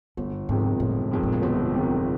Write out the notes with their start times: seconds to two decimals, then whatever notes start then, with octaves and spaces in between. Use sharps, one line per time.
0.17 G1 G2
0.49 F2 G#2 C3 D#3 G#3
0.80 G1 A2
1.11 F2 G#2 C3 D#3 G#3
1.23 A2
1.32 A#2
1.42 G1 B2
1.74 F2 C3 D#3 G#3